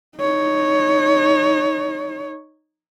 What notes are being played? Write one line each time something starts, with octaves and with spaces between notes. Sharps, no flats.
D#4 C#5